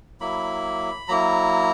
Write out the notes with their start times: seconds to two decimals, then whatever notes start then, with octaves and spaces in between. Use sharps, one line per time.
0.20 F#3 A#3 E4 B5
1.08 F#3 A#3 E4 A#5